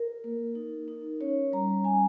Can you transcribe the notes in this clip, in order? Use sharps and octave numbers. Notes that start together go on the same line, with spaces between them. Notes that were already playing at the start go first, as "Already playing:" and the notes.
Already playing: A#4
A#3
D#4
D#4
C#4 C#5
G3 A#5
C#4 G#5